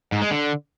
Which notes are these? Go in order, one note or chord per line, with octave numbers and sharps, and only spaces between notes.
G#2
G#3
D3